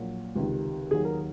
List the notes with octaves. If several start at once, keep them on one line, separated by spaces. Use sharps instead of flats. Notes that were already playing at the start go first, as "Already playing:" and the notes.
Already playing: A#1 A#2 F#3
C#2 C3 D#3
D#2 D#3 F#3 G#4
A#4